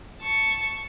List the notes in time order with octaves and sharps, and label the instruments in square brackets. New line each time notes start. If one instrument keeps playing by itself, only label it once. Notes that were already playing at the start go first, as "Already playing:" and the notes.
[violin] A5 C#6